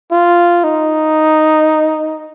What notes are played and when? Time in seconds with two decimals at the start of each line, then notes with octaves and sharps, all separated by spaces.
0.11 F4
0.64 D#4